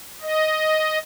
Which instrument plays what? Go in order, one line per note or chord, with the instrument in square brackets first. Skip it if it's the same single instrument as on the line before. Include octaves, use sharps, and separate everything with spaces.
[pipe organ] D#5